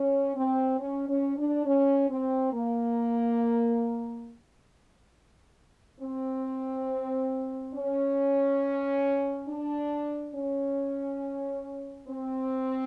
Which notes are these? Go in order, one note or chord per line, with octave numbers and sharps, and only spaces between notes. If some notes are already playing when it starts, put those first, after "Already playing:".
Already playing: C#4
C4
C#4
C#4
D4
C#4
C4
A#3
C4
C#4
D4
C#4
C4